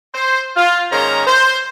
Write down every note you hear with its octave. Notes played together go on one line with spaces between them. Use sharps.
C5
F4
G#2 D#3 A#3 C#4 C5 A#5
C5